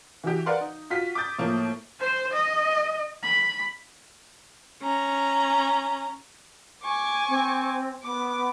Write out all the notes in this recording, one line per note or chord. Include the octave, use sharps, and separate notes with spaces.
E3 F#4 G4
A#4 B4 D5 F5 F#5 C6
D#4
F4 F#4 B6
D6 D#6 G6 A6
A2 F3 A#3
C5
D#5
B5
C#4 A#5
G#5 C#6 D6
C4
B3 D6